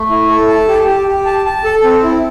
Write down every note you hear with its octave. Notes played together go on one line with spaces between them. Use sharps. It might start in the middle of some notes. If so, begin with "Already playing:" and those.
Already playing: A3
E4
A4
A5
G4
G4
G4
A5
A5
A4
C4
E4